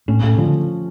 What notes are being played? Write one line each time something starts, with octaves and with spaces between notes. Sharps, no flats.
A2 C#4
A2 A3
D3 F3